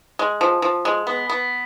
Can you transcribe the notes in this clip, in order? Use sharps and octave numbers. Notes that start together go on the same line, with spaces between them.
G#3
F3
F3
G#3
B3
B3